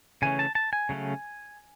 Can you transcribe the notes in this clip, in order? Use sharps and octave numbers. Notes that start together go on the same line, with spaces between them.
C#3 E3 A3 C#4 G#5
A5
A5
G#5
C#3 F#3 A3 C#4